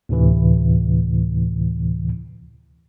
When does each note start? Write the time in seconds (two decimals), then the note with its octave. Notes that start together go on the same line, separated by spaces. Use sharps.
0.09 D2 A2 C3 E3